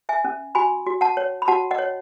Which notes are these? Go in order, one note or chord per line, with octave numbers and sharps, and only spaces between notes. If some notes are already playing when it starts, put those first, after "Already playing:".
E5 G#5
C#4
F#4 G#5 B5
F#4
F#5 A5
C#5
B5
F#4 F#5 A5
D#5 F#5
C#5